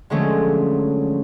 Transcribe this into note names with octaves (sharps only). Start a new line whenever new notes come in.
D3 F3 F#3 G#3 A3 C#4